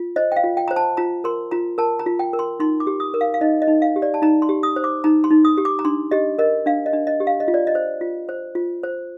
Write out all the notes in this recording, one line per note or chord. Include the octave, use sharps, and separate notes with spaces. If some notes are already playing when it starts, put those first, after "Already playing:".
Already playing: F4
C5 D#5
G5
F5
F4
G5
C5 A#5
A5
F4 A#5
A#4 C6
F4 A#5
A#4 A5
A#5
F4
G5
A#4
C6
D#4 C6
D6
G4
D#6
A#4
F5
F5
D#4 D#5
D#5
D#4
F5
G4
D5
A5
D#4 A#5
C6
G4
D#6
C5
D6
D#4 A#5
C6
D#4
D#6
G4
D6
A#5
D4 C6
G4 D#5
A#4 D#5
D4 F5
D#5
D4
D#5
G4
F5
D#5
F4
D5
D#5
C5
F4
C5
F4
C5